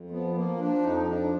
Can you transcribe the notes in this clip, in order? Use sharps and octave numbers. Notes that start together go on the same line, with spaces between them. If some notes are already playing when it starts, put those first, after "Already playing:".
Already playing: F2
F3 B3
F3 A#3
F3 D4
F2 D#4
F3 D4